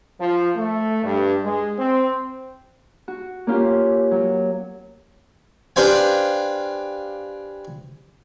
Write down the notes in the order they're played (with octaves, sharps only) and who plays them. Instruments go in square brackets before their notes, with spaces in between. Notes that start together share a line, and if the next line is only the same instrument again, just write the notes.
[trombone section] F3
A3
G2
G#3
C4
[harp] F#4
A#3 C#4 F4 G4
F#3
[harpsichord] D4 G4 B4 C5 F5 G#5